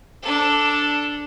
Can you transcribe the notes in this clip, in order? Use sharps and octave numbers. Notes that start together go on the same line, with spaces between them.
D4 A4